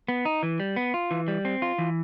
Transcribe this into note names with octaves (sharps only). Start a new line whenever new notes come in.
B3
D#4
E3
G3
B3
F4
E3
G3
C4
F4
E3